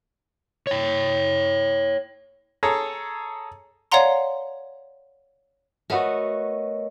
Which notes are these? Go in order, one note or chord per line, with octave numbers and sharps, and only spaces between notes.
C#5 G5
G#4 A4 C#5 A#5
C#5 D5 F5 F#5 A#5 C6
A3 B3 F#4 A#4 C#5 D#5